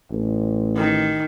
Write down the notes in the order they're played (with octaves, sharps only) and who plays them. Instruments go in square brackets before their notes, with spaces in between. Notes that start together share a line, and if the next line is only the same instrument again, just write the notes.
[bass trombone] A1
[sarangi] D#3